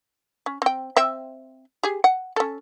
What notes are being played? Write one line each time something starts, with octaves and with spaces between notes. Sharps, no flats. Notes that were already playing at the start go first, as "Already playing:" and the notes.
C#4
C4 G5
C4 E5 G5
G4 G#4
F#5
C#4 A4